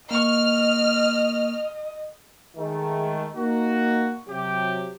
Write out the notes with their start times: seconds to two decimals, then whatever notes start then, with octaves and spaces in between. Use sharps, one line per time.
0.11 A#3 D#5 C#6 F6
2.55 D#3 G#3 A3
3.35 A#3 D#4 F#4
4.27 C3 F#3 G4